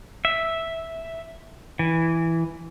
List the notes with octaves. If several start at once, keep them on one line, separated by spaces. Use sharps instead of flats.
E5
E3